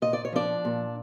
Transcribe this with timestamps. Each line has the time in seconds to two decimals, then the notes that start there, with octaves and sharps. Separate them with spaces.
0.02 A#2 D#5
0.13 D5
0.25 C#5
0.32 F3 D4 D5
0.65 A#2